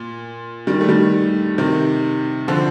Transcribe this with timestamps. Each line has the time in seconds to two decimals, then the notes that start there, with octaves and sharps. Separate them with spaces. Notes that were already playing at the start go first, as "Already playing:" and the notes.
Already playing: A#2
0.67 D#3 G3
0.81 A3
0.89 D#3 G3
1.58 C3 D#3
2.48 D3 F3